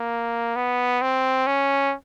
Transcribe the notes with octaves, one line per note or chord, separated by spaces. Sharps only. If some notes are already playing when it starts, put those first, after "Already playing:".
Already playing: A#3
B3
C4
C#4